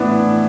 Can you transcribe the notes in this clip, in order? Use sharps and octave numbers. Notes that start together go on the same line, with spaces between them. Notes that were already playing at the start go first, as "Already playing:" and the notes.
Already playing: A2 E3 B3 D4 E4